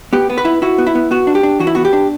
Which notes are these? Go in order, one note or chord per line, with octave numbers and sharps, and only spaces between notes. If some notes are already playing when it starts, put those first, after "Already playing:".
B3 G4
B3
B4
E4
E4 F#4
B3
E4
B3
B3 F#4
D4
G4
D4
E3 F#4
E4
B3 F#4
G4
D4